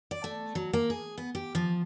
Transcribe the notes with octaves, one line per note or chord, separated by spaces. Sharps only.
D5
A3
F#3
A#3
G#4
B3
G4
F3